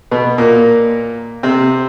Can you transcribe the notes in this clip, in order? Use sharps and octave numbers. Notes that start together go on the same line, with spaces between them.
B2 B3
A#2 A#3
C3 C4